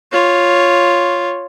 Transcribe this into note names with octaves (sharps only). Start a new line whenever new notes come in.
F4 C#5